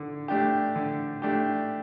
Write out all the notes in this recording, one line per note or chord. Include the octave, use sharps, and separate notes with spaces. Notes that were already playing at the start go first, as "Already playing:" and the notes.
Already playing: D3
A3 D4 G4
D3
A3 D4 G4